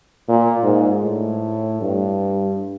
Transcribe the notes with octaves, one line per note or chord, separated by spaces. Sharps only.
A#2
G#2
A2
G2